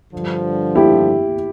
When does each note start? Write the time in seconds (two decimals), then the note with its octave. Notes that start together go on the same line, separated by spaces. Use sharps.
0.12 G2 D3 F3
0.75 E4 G4